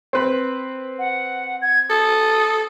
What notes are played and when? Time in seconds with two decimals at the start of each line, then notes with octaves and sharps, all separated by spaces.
0.13 C4 B4
0.99 F#5
1.62 G#6
1.90 A4 D#6